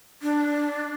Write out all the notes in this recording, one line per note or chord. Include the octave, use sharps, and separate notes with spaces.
D4